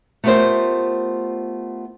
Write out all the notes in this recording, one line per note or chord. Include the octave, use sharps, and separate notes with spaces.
A3 B3 F4 G4 A#4 C5